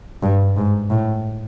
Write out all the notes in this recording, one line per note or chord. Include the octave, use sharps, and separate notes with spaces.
G2
G#2
A2